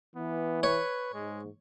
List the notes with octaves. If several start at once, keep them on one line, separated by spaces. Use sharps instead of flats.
E3 B3
B4 C#5
G#2 G#3